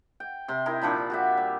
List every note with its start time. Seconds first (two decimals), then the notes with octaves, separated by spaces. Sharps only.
0.20 G5
0.48 C3 C6
0.66 D#4 E4 A#4
0.82 A#2 F3 D4 B5
1.10 F#4 G4 E5
1.37 G3